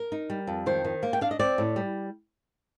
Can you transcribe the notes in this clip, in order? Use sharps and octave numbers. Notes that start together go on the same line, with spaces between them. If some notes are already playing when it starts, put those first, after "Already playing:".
Already playing: A#4
D#4
G3
F2
D#3 C5
D#3
A#3
G5
D4 F5
D#5
C4 D5
A2
G3